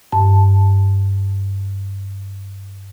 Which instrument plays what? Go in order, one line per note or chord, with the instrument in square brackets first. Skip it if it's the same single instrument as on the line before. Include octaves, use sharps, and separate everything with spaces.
[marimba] G2 A5